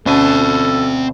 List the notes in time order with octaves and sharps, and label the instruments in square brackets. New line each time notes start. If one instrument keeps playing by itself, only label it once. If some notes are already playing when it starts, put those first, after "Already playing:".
[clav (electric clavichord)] D2 B2 G#5 [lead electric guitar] C4 A5 [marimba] C#4 [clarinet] A4